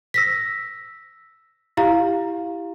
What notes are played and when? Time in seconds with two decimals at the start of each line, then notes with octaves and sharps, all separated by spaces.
0.14 E6 A#6 B6
1.77 E4 G4 F5 A#5